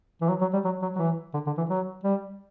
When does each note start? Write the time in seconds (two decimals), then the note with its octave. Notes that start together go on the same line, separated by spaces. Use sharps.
0.21 E3
0.28 F#3
0.41 F#3
0.53 G3
0.64 F#3
0.82 F#3
0.96 F#3
0.99 E3
1.34 D3
1.47 D3
1.58 E3
1.70 F#3
2.04 G3